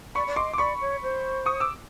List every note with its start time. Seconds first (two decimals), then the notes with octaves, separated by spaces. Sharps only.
0.15 D5 B5 C#6
0.27 D5
0.36 D#5 C6 D6
0.53 D6
0.58 D5 B5 C#6
0.81 C#5
1.03 C5
1.46 C#6 D#6
1.60 D6 E6